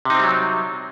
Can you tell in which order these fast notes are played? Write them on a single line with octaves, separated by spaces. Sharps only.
C3 D#4 C4 G3 F#3